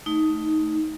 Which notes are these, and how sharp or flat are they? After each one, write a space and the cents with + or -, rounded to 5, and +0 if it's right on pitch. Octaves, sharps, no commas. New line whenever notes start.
A3 +0 D#4 +10